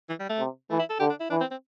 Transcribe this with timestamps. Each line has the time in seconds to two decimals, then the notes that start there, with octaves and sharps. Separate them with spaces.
0.09 E3
0.20 G3
0.30 A3
0.39 C3
0.70 E3 A3
0.79 E4
0.90 A4
1.00 D3 G4
1.10 D4
1.20 E4
1.30 E3 D4
1.41 C4
1.51 C4